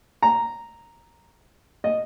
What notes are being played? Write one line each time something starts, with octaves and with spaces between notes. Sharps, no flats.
A#5
D#5